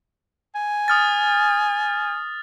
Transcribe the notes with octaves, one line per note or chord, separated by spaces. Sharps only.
G#5
D#6 F6 A6